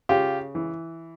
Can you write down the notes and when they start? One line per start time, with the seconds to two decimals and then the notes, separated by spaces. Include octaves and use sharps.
0.09 C#3 F4 G4
0.55 E3